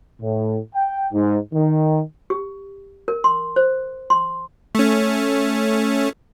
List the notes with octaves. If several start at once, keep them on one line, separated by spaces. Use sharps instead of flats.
A2
G5
G#2
D#3
G4
A#4
C6
C5
C6
A3 C#4